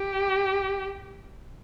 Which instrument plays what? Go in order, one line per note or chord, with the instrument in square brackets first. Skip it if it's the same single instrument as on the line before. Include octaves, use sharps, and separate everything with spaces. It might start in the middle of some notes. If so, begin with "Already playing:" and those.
Already playing: [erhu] G4